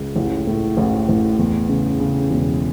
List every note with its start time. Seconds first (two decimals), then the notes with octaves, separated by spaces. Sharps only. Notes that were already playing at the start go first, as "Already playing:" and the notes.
Already playing: C#2
0.16 A1
0.47 A2
0.77 A1
1.09 A1
1.39 E2
1.69 C#3
2.00 C#3
2.31 E1